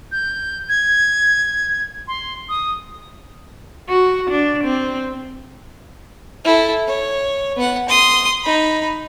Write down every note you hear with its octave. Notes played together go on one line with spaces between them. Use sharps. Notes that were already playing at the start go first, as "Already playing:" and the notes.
G6
G#6
C6
D#6
F#4
D4
C4
E4 A4
C#5
B3 F#5
C6 D#6
D#4 B5